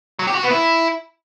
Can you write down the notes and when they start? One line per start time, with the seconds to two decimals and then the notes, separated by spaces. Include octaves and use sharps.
0.19 F#3
0.27 G4
0.35 F#4
0.43 B3
0.51 E4